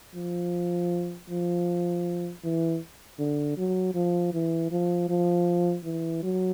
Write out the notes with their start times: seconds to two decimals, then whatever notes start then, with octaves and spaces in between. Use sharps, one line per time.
0.15 F3
1.30 F3
2.44 E3
3.19 D3
3.57 F#3
3.94 F3
4.34 E3
4.71 F3
5.09 F3
5.84 E3
6.23 F#3